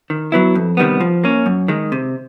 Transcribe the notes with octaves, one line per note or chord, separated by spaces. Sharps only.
D#3
F#3 B3 E4
F2
C3 D#3 G3 B3
F3
A#3 C#4
F#2
D#3 G#3
C3